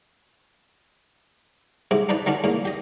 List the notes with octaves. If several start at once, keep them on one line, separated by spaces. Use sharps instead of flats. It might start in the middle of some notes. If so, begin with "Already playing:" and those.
G#2 C3 D6
D4 D#4 B4 D5
D#3 F#3 C#4 D4
E2 A#2 A#3
G4 D#5